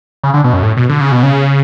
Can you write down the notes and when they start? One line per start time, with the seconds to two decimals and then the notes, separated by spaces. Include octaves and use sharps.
0.23 C#3
0.34 D3
0.44 B2
0.53 F#2
0.63 A2
0.77 B2
0.89 D3
1.01 C#3
1.12 B2
1.23 C#3